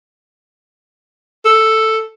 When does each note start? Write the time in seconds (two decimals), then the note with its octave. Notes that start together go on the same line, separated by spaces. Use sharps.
1.45 A4